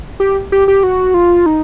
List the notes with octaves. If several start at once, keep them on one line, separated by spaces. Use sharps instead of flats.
G4
G4
G4
F#4
F4
D#4